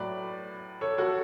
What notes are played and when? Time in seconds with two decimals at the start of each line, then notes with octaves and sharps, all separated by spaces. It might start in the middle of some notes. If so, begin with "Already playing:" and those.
Already playing: A2 F#3 B4 D5
0.81 A4 C#5
0.98 F#4 A4